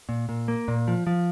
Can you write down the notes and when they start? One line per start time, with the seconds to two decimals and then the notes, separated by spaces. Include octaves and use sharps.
0.09 A#2
0.29 A#2
0.48 A#3
0.68 A#2
0.88 F3
1.07 F3